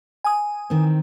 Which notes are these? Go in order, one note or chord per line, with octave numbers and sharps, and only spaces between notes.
G#5 D#6
D#3 C4